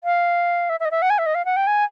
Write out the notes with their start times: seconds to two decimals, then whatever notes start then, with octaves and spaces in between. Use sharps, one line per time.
0.04 F5
0.69 E5
0.80 E5
0.85 D#5
0.91 E5
1.02 F#5
1.10 G#5
1.18 E5
1.26 D#5
1.35 F5
1.45 F#5
1.56 G5
1.67 G#5